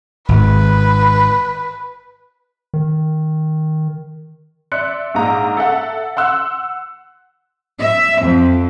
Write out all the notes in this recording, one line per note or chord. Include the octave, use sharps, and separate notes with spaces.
G#1 B4
D#3
D5 E5 C6 F#6 C#7
A#1 G#2 A#3 D#5 A#5
A4 E5 F#5
F#5 C6 E6 F#6
E5
F2